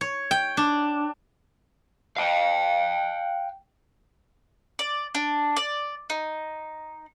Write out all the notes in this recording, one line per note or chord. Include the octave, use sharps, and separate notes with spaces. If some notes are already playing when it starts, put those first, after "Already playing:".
C#5
G5
D4
F5 G5
D5
D4
D5
D#4